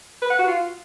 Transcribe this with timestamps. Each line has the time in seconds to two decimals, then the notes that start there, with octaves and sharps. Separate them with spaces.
0.22 B4
0.30 F#5
0.39 F#4
0.47 F4